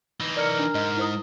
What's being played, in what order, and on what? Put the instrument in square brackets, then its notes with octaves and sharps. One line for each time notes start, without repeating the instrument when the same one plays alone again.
[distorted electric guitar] E3 D#4
[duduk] A#4 [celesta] D5 F6 C#7
[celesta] D4
[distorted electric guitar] G#2 [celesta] D#5
[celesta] E4 C5 D#6